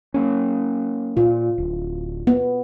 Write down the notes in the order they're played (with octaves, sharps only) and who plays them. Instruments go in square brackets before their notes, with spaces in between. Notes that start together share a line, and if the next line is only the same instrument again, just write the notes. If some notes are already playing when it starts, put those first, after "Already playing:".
[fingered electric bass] F#3 A#3 C#4
[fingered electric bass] A#2 [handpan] F4
[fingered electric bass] D1
[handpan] B3